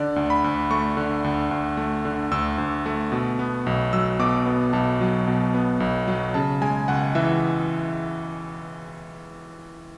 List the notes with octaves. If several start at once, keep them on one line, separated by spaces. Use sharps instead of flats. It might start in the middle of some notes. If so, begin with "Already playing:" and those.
Already playing: D3 D5
D2
B5
D2
A3 C#6
D3
D2
D2
A3
D3
D2 E6
D2
A3
B2
B3
B1
F#3 E6
B2 D6
B3
B1 A5
F#3
B2
B3
B1
F#3
C#3 A5
G#3 G#5
C#2 F#5
E3 E5